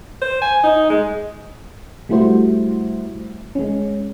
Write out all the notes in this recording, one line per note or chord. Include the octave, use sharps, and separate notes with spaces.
C5
G#5
D#4
G#3
G3 A3 E4 F#4 C5
G#3 C#4